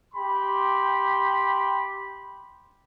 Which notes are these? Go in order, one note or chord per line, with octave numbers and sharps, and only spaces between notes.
G4 B5 C6